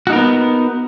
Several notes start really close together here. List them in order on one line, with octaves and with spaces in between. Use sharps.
F#4 D#4 A#4 B3